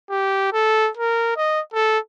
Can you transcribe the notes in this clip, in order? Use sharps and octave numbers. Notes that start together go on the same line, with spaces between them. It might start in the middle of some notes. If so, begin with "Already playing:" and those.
G4
A4
A#4
D#5
A4